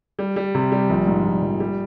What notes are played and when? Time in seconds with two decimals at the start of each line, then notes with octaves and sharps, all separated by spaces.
0.19 G3
0.36 G3
0.55 C3
0.72 G3
0.90 A#1
1.07 G#2
1.25 A#1
1.43 A#1
1.60 G3